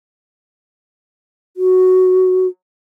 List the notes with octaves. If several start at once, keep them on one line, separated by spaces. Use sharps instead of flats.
F#4